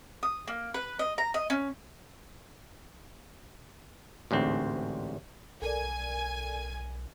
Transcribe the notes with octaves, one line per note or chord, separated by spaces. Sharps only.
D#6
A#3
B4
D#5
A#5
D#5
C#4
A1 D2 G#2 C4
B1 A4 A#4 D5 G#5